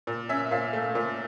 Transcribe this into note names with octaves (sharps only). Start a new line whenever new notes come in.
A#2
C#4 E5
A#2 F5
A3
A#2